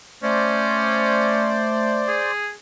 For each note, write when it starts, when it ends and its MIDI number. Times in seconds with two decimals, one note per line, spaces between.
0.23 2.26 57
0.23 1.55 61
0.23 2.32 72
0.23 2.32 74
2.08 2.50 68